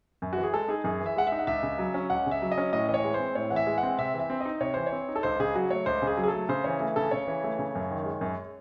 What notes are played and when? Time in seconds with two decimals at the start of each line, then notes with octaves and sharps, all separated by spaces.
0.22 F#2
0.33 E3 F#4
0.43 G#4
0.54 G#3 A4
0.68 D#4 G#4
0.84 F#2 G#4
1.01 E3
1.06 E5
1.16 G#3 F#5
1.27 E5
1.32 D#4
1.39 F#5
1.47 C#2 E5
1.63 C#3
1.79 F#3
1.94 C#4
2.10 C#2 F#5
2.26 C#3
2.31 E5
2.42 F#3
2.52 D#5
2.58 C#4
2.73 A2 D#5
2.88 E3 D#5
2.94 C#5
3.04 G#3
3.14 C5
3.19 C4
3.35 A2 C#5
3.50 E3 F#5
3.56 E5
3.67 G#3
3.78 F#5
3.83 C4
3.98 C3 E5
4.14 E3
4.19 E5
4.30 C4
4.40 D#4 D#5
4.60 C3 C#5
4.74 E3 C5
4.86 C#5
4.92 C4
5.09 D#4
5.16 A4
5.23 C#2 C5
5.40 C#3 G#4
5.54 F#3 F#4
5.70 A3 C#5
5.86 C#2 C5
6.02 C#3
6.07 G#4
6.17 F#3
6.23 G#4
6.28 A4
6.33 A3
6.49 C#3 C5
6.64 E3 C#5
6.80 A3
6.96 C#3 A4
7.11 C#3 C#5
7.27 E3
7.44 A3
7.59 C#3
7.75 F#2
7.91 D#3
8.05 G#3
8.21 F#2